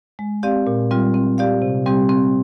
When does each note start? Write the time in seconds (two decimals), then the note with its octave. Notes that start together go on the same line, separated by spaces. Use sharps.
0.19 G#3
0.43 C4 G4 D5 F5
0.67 A#2
0.91 G3 C4 F4
1.14 C4
1.38 G4 D5 F5
1.62 C3
1.86 G3 C4 G4
2.09 C4